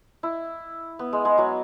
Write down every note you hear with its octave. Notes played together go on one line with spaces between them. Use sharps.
E4
B3
G#3
G#3
F#3